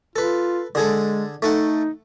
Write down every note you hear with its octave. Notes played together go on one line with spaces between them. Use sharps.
F4 A4 B4
D3 G#3 G#4 A4
A3 D#4 A4 F#5